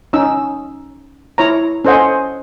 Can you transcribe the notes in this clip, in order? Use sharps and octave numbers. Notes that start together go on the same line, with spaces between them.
C#4 D#4 E6
E4 C#5 A#5
C#4 A4 C5 D#5 F#5 G#5